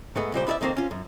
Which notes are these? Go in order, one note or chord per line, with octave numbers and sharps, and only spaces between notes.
G#2 A3 B3 G#4
C#2 A#2 G3 C5
B3 E4 A4 D5 E5
F2 D#3 A#3 C4 C5
C#4 F4
F#2